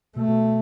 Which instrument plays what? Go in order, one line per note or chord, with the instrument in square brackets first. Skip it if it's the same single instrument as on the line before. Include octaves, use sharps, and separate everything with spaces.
[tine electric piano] B2 [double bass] A3
[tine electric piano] B2